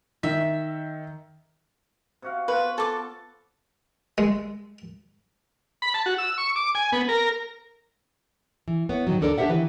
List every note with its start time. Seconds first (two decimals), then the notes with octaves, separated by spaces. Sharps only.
0.23 D#3 E5
2.22 C3 F#4 F5
2.48 B3 F4 F#4 B4
2.78 A4 D6
4.18 G#3
5.82 B5
5.94 A5
6.06 F#4
6.18 E6
6.38 C#6
6.56 D6
6.75 G#5
6.92 B3
7.09 A#4
8.68 E3
8.89 B3 E4 C#5
9.07 G#2 D#3 F#3
9.21 D2 D4 A4 A#4 D5
9.38 D4 G4 C5 E5 F#5
9.49 D#3 E3 B4